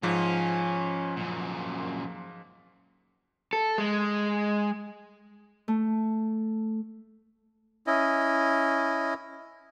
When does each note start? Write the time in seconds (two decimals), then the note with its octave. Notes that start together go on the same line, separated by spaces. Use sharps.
0.03 G#2 F3 C#4
1.17 F#2 A#2
3.53 A4
3.78 G#3
5.68 A3
7.87 C#4 E4 D#5